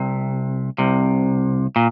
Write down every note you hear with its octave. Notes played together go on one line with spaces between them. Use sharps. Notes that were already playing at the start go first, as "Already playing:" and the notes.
Already playing: C2 C3
C2 C3
A#2